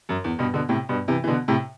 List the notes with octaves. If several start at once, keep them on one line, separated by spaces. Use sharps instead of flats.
F#2
E2
G2 B2
B2 D3
A2 C3
G2 B2
C3 E3
E3
B2 D3
A2 C3